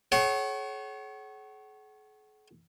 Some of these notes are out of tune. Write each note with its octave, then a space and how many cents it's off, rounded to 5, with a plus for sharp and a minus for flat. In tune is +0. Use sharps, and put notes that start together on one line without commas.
G#4 +45 C#5 -15 F#5 +35